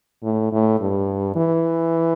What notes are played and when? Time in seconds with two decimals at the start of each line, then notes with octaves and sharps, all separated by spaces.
0.23 A2
0.52 A2
0.80 G2
1.36 E3